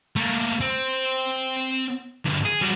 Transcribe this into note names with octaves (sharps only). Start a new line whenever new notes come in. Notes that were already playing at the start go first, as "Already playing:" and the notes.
A3 A#3
C4
D2 G2
G#4
G3 F#4